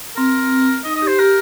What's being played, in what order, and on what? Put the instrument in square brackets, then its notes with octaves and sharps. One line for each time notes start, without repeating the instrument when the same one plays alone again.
[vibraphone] C4 [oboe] A#4
[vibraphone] D#4 [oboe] D#5
[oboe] D#5
[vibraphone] G4
[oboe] C5
[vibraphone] G4 [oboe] A#4